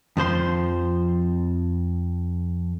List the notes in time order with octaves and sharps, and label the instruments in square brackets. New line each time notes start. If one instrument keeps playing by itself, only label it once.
[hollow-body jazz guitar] F2 F3 C5 C6